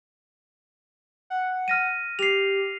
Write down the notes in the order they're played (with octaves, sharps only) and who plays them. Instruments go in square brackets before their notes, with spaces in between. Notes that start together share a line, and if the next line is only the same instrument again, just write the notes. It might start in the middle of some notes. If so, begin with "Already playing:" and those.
[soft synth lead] F#5
[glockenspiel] F6 A#6 D#7
[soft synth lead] G4 [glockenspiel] C7 F7